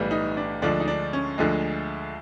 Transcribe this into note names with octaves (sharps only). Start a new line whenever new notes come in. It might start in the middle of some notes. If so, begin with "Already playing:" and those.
Already playing: B1 A2 E3 G3
D#4
D4
D2 D3 F3 G#3 D4
D#4
D4
C#4
D2 D3 F3 G#3